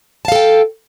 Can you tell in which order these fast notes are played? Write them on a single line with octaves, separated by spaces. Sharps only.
A5 F5 A4 G5